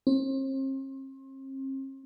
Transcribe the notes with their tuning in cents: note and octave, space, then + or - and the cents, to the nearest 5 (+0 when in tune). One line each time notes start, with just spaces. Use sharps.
C4 +40